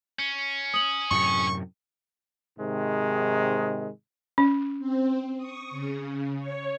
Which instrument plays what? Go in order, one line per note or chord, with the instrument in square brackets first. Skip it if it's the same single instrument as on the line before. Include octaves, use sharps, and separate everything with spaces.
[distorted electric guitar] C#4
[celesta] D#6 F#7
[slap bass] F#2 A2 C3 [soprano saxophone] C#6
[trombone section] G#2 C3 D#3 G#3
[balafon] C#4
[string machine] C4
C#6 D#6
C#3
C#5